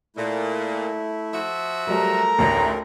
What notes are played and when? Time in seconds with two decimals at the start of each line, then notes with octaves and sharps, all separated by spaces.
0.16 A#2 A3 E4
1.33 F3 F#4 E5
1.87 F#3 G3 A3 A#4 A#5
2.39 A1 D2 A#2 D3 D#3